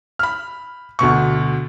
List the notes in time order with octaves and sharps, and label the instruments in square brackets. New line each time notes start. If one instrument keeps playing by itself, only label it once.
[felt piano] B5 F6
D2 B2 C#6